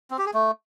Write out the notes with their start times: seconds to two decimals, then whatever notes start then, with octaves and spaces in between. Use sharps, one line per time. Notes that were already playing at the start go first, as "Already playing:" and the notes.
0.11 C4
0.18 G4
0.26 G#4
0.34 A3